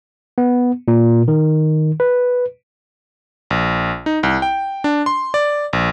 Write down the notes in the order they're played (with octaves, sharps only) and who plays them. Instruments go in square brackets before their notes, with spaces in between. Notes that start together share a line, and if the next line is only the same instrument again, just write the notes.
[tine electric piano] B3
A#2
D#3
B4
[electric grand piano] A#1
D#4
C2
G5
D4
C6
D5
A#1